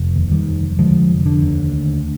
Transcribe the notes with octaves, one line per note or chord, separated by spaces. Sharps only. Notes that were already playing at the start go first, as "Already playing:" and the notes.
Already playing: F1
D#2
D#3 G3
F1
D3 F3 G#3
F1
D3
D#2
D2